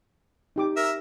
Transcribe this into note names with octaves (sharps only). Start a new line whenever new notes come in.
D#4 G4 D6
A#4 E5